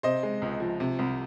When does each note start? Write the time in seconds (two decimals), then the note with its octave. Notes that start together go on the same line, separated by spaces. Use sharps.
0.03 C3 C5 D#5
0.23 G#3
0.42 C#2
0.60 F3
0.80 C3
0.99 C2